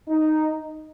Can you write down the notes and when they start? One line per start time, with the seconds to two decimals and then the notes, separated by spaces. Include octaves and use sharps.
0.09 D#4